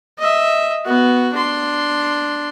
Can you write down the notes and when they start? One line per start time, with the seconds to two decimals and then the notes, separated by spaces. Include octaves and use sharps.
0.18 D#5 E5
0.86 B3 F#4
1.33 D4 C6